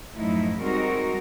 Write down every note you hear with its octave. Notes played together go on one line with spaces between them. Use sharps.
F#2 A2 F3 A3 D#4 E4
G3 G#3 C4 D#4 F#4 A#4